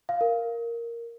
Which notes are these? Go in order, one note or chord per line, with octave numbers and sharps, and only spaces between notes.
F5
A#4